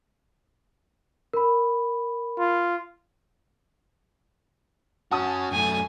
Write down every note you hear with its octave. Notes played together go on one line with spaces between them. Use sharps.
A#4 B5
F4
C#4 F#4 F#5 A5 D#6
F#2 A3 G#5